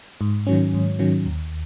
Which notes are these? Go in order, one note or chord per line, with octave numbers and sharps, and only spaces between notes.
G#2
D#3 F#3 C#4
G#2
D#3 F#3 C#4
D#2